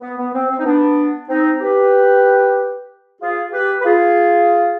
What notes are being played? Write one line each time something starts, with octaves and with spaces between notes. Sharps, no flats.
B3
B3
C4
C4
D#4
B3 D4
C4 D#4
G4 B4
F4 G#4
G4 B4
B4
F4 G#4